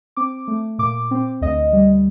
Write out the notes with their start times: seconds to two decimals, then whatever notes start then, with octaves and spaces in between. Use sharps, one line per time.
0.17 C4 D6
0.48 A3
0.79 A#2 D6
1.11 C4
1.41 D2 D#5
1.73 G3